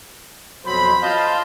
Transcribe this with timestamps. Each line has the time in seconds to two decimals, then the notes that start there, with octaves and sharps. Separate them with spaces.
0.65 F2 B2 F#3 C5 B5
1.02 F4 D#5 F5 A5 G6